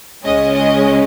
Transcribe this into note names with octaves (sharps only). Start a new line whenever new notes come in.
C#2 C#3 G#3 C#4 D#5
D#5